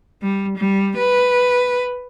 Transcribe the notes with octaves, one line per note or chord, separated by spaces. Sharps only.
G3
G3
B4